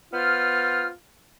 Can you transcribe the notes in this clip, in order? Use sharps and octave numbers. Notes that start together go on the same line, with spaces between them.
B3 F4 C5 F6